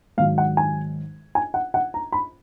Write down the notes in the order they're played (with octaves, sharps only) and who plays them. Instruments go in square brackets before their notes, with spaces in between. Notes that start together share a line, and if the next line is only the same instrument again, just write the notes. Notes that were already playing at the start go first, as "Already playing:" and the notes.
[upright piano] G#2 D#3 F#3 F5
F#5
G#5
G#5
F#5
F#5
A#5
B5